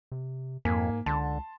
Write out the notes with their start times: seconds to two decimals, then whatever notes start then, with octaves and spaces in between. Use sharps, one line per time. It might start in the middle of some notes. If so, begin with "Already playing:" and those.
0.12 C3
0.65 F2 G#2 A#3 G#5 B6
1.06 C#2 D3 A5 C6